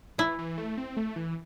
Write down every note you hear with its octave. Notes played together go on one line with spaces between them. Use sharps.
E3 E4
E3
A3
C4
A3
E3